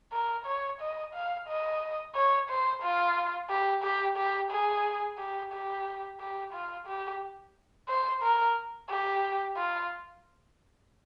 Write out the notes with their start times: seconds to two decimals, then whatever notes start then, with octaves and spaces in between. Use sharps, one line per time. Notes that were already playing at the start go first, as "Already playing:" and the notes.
0.13 A#4
0.46 C#5
0.81 D#5
1.14 F5
1.48 D#5
2.15 C#5
2.49 C5
2.83 F4
3.50 G4
3.83 G4
4.17 G4
4.51 G#4
5.19 G4
5.53 G4
6.20 G4
6.53 F4
6.87 G4
7.89 C5
8.22 A#4
8.90 G4
9.57 F4